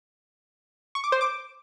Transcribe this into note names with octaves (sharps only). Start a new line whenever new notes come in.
C#6
D6
C5
D6